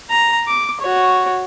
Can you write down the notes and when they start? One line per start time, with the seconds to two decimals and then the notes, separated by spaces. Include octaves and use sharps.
0.10 A#5
0.48 D6
0.81 F#4 C#5